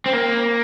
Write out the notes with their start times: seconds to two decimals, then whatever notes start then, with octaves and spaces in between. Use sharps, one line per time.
0.06 C4
0.13 A#3